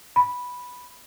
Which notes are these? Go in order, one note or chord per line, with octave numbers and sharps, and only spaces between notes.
B5